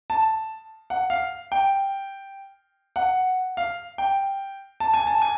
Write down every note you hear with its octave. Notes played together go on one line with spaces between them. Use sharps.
A5
F#5
F5
G5
F#5
F5
G5
A5
G#5
A5
G#5